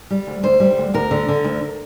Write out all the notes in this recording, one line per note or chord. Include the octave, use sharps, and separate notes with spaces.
G3
D2
D2 C5
G3
D2
D2 A#4
D3
D3
D2